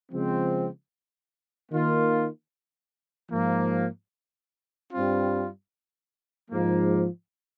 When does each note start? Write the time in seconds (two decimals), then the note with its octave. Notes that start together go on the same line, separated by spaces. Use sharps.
0.11 C#3 F3 G#3 C4
1.71 D#3 A#3 F4
3.31 G#2 F3 A#3
4.91 G2 G3 C4 F4
6.51 G#2 F3 A#3